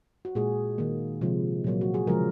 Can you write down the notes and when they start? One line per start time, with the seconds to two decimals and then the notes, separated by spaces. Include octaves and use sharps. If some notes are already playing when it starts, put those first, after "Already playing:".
0.25 F#4
0.35 A#2 G#3 G#4
0.78 D#3 A#3
1.21 C3 F3 G#3
1.64 A#2 F#3 A#3
1.81 F#4
1.94 G#4
2.07 C#3 F3 G#3 A#4